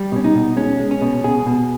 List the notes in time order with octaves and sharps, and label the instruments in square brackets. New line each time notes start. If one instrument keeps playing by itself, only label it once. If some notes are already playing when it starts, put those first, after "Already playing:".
Already playing: [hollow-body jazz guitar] G3
B2 C#4
D#4
B2
G#3 C#4
G#3
C#4
B2
B2 G#4
B2